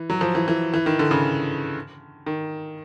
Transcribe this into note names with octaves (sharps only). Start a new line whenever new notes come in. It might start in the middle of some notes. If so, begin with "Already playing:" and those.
Already playing: E3
F#3
F3
E3
E3
E3
D#3
D3
C#3
D#3